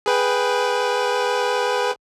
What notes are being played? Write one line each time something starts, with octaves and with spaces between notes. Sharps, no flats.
G#4 B4 G5